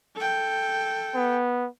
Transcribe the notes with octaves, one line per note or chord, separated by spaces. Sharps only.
A4 G5
B3